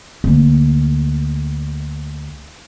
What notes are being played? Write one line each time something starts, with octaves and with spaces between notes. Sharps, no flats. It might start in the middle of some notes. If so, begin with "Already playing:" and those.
D2 A#3